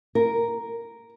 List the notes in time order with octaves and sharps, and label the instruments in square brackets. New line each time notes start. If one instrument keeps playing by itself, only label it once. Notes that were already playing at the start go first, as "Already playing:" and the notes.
[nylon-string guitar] A#4